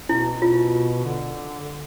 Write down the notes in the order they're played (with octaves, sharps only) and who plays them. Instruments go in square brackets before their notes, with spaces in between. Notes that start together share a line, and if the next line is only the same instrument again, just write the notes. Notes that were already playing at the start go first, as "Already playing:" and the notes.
[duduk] B2 [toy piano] E4
[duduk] B2 [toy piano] F4
[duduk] D3